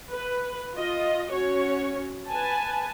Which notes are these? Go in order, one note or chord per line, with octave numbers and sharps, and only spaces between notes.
B4
F4 D#5
C#4 F#4 C#5
B4 G#5 A5